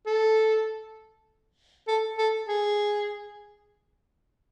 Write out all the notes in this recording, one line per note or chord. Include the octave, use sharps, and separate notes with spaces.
A4
A4
A4
G#4